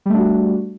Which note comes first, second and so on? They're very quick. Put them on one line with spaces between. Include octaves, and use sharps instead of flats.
G3 A3 D4 F#4